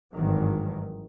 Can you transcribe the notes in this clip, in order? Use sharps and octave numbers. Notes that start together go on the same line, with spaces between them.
G#1 G2 D#3 E3 F#3